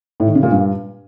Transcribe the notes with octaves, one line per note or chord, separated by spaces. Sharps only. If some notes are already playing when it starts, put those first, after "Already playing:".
A2
D#3
C#3
A#2
G2